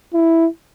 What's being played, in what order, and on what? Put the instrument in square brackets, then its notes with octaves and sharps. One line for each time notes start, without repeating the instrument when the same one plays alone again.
[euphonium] E4